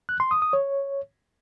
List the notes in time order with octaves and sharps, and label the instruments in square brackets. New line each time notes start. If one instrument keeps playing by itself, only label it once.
[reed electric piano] F#6
C6
D#6
D#6
C#5